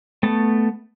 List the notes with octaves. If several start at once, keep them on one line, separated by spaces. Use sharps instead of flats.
A3 B3 A5